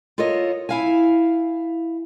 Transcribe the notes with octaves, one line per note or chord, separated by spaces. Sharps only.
F4 A4 A#4 C#5 D#5
E4 F5 G#5